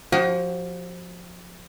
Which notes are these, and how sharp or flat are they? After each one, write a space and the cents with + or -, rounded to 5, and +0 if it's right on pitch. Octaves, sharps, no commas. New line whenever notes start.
F3 +25 F#4 +45